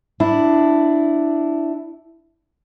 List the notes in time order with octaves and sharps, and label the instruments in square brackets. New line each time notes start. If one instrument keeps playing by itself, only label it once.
[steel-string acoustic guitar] D4 E4